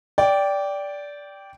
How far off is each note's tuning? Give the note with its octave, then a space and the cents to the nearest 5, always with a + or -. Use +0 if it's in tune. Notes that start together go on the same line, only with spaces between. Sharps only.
D5 -15 G5 +0